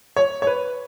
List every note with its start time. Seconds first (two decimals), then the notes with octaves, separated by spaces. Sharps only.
0.16 C#5
0.42 C#5
0.47 B4